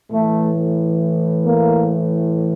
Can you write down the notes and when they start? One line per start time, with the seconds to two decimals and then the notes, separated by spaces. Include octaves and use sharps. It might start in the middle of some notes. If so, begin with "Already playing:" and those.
0.11 A2 E3 A3
1.45 A#3